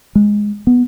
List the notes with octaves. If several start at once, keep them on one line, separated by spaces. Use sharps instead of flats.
G#3
B3